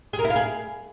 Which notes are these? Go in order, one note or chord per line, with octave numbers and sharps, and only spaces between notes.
G#4
A#4
E4
F5
G#4